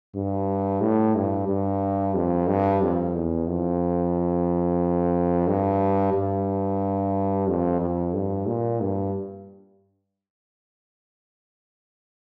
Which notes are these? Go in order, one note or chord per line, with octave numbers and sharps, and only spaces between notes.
G2
A2
G2
G2
F2
G2
F2
E2
F2
G2
G2
F2
F2
G2
A#2
G2